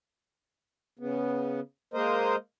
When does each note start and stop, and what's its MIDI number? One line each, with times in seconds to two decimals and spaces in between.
0.99 1.60 49
0.99 1.60 59
1.94 2.36 56
1.94 2.36 58
1.94 2.36 70
1.94 2.36 72
1.94 2.36 75